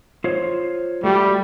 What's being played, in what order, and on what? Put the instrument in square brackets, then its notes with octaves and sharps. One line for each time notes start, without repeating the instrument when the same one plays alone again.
[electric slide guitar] F4 C5 C#5
[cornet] G3 [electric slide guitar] A3 F#4